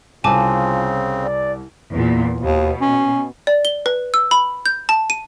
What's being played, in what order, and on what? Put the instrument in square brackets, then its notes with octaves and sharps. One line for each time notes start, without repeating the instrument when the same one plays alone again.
[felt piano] C2 [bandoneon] C#3 C4 [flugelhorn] F4 [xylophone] G#5 A5 D6
[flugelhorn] D5
[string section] E2 A#2
[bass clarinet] D#2 [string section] B2
[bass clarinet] C#4
[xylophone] D5
G7
B4
E6
B5
G6
A5
D#7